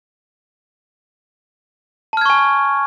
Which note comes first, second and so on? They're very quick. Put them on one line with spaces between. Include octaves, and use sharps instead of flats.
A5 F6 G#6 C#6 G#5